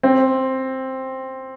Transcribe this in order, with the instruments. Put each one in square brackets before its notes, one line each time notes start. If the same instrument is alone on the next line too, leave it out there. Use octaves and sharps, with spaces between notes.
[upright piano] C4